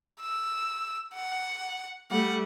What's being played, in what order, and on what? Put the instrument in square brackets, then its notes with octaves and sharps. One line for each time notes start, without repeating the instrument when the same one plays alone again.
[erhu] E6
F#5
[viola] G3 A3 [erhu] F#5